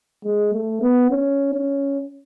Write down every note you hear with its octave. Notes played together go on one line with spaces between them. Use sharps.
G#3
A3
B3
C#4
C#4